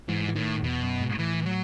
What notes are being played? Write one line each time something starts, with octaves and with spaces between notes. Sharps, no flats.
G#2 E3
E3
A2 D#3
E2 B2
F#2
G#2
A2 E3
F#3